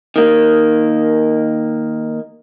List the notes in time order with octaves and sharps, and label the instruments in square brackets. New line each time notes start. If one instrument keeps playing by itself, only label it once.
[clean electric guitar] D#3 A#3